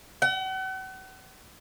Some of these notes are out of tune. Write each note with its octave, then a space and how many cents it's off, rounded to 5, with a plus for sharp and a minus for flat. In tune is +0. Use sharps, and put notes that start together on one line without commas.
F#5 +40